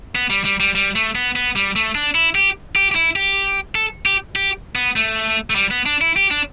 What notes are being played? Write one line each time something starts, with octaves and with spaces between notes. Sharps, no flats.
B3
G3
G3
G3
G3
A3
B3
B3
G3
A3
D4
E4
G4
G4
G4
E4
G4
A4
G4
G4
B3
A3
A3
G3
B3
D4
E4
G4
D4